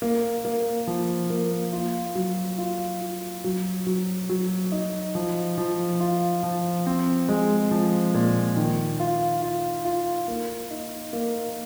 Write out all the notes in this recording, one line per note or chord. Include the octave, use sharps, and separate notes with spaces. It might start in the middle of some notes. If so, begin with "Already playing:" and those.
A#3
A#3
F3
A#3
F4
F#3
F4
F4
F#3
F#3
F#3
D#4
F3
F3
F4
F3
C4
G#3
F3
A#2
D#3
F4
F4
F4
A#3
D#4
A#3